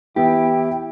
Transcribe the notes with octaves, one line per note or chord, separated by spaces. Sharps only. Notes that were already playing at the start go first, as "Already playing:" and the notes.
E3 B3 E4 G4 G5